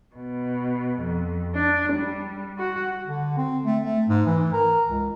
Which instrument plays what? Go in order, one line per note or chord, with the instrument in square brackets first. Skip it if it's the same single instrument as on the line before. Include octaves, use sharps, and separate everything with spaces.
[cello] B2
F2
D4
G3
F#4
[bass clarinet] D3
C4
A3
A3
G#2
E3
A#4
C#2